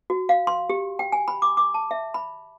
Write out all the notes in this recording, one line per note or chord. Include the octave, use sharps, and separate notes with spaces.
F#4
F5
C6
G4
G5
G#5
B5
D6
D6
A5
E5
B5